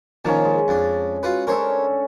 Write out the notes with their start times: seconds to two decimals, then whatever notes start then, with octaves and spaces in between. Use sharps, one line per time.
0.25 A#2 D#3 F3 C#4 A5
0.45 G#3
0.68 F2 D4
1.23 F4 F#4 B4
1.47 C#4 D4 A4 A#4 C5 C#5